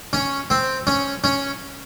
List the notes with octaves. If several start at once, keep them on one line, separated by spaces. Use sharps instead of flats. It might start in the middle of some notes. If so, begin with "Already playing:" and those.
C#4
C4
C#4
C#4